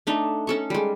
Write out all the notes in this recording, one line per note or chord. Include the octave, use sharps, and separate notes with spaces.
A3 D4 D#4
C#4 A4 C#6
G3 G#3